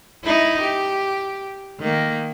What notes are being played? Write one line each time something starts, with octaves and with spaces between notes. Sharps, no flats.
D#4 E4
G4
D#3 A#3